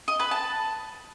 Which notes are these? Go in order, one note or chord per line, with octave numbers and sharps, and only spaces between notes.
D#5
B4
A5